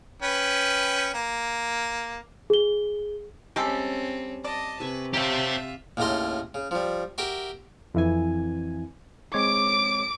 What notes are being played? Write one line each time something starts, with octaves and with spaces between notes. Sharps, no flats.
C#4 B4 G5
A#3
G#4 G7
G3 G#3 C4 C#4 G4 A4
D5 D#5 A5
C3 B4 G#5 C#6
F#3 G3 A3 F4 G4 C5 E5
D#2 A2 C#3 A3 A#5 C6
C#3
F3 G3
F#4 G4 A#4 E5 G5
F2 E3 G#5
G#3 C4 C#5 D6 D7